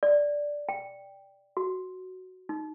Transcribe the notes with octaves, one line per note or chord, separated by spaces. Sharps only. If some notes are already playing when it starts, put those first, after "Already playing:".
D5
G5
F#4
D#4